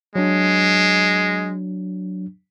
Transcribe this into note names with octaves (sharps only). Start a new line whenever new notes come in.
F#3 G#3 D4